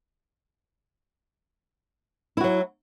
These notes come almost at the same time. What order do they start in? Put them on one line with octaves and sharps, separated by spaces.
E4 F#4 F#3